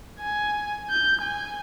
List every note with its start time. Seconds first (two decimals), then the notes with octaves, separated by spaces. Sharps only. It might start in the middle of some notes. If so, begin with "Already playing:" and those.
0.20 G#5
0.90 G6
1.22 G#5